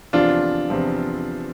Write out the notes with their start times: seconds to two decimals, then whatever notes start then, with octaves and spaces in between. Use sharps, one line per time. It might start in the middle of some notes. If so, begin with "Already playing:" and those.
0.13 E2 C3 F3 D4 F4
0.70 E2 C3 F3